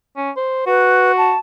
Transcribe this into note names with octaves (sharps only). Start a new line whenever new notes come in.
C#4
C5
F#4 B4
A5